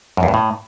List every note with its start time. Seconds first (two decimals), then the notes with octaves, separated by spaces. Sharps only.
0.17 F#2
0.23 E2
0.28 G2
0.34 A2